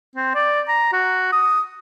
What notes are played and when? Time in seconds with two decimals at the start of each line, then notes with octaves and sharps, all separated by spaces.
0.16 C4
0.35 D5
0.68 A#5
0.93 F#4
1.33 D#6